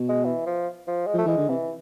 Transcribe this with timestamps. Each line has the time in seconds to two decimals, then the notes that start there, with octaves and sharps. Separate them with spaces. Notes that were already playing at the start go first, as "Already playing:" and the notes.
Already playing: B2
0.09 G#3
0.24 E3
0.46 F3
0.88 F3
1.07 G#3
1.14 F3 A3
1.25 E3 G#3
1.37 D3
1.49 C3 E3